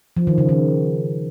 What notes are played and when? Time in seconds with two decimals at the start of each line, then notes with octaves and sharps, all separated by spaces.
0.17 F3
0.27 D#3
0.38 C#3
0.49 D#3